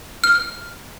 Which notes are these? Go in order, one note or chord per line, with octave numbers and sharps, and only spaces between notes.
F6